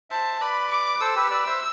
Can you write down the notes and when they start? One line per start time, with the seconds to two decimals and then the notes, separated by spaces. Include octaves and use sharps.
0.10 C5 E5 A5
0.41 B4 D5 B5
0.70 D6
1.01 A4 C5 E6
1.16 G4 B4
1.31 B4 D5
1.47 C5 E5